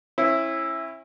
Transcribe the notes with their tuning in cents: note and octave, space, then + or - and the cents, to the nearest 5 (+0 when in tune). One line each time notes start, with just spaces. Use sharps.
C#4 -40 E4 +0